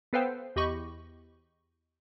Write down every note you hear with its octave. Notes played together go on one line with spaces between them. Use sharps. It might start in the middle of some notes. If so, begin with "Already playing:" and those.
B3 A4 B4 C5 F5 G5
E2 G4 D#5 B5 C#6